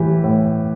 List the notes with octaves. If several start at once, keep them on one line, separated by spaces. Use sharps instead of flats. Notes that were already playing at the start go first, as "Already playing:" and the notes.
Already playing: A2 E3 G4
A2